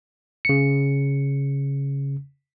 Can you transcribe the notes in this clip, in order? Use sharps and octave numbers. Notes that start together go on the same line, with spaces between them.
C#3 C#7